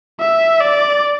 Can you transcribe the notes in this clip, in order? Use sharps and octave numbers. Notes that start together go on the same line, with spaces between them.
E5
D5